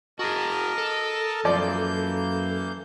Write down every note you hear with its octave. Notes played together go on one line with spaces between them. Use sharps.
F#4 G#4 A#4 D#5 A5
A4
F#2 E3 F3 A#3 D5 G6